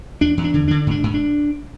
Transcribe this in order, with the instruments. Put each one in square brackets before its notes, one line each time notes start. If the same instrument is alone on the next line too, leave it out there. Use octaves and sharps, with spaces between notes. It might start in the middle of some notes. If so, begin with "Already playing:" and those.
[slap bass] E2 D4
E2
D4
D3
D3 D4
G#2 D4
G#2
D4